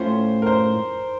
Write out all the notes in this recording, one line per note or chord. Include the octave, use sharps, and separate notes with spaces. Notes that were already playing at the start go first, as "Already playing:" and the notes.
Already playing: A2 A3 C#4 F4 C5
A#4
C5